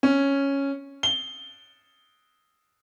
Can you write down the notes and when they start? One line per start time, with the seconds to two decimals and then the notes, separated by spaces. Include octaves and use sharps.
0.03 C#4
1.03 G7